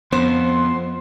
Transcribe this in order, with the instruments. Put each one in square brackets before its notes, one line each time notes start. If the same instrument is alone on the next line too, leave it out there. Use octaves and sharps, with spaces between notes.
[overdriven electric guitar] F2 [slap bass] B3 [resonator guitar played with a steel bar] C5 [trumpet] C6